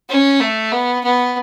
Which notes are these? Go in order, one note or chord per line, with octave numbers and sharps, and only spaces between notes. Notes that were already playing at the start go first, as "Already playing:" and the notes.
C#4
A3
B3
B3